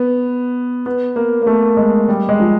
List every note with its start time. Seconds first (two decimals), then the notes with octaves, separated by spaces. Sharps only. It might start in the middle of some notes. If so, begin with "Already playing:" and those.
Already playing: B3
0.86 B3
1.16 A#3
1.42 A#3
1.47 A3
1.77 G#3
2.08 G3
2.29 G#3
2.40 F3